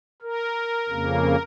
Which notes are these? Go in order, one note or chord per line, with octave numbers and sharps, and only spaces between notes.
A#4
F2 C#3 A#3